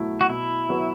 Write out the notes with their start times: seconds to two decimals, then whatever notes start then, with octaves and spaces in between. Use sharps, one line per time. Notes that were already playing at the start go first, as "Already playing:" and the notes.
Already playing: B2 F#3 A3 E4
0.21 F#4
0.29 B2 E4
0.69 F#3 B3 F#4 B4